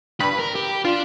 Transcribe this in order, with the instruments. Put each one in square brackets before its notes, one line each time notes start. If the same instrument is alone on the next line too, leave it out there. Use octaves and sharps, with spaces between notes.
[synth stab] G2 B5 [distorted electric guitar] B4
[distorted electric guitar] A#4
G4
[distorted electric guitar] D4 [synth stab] F4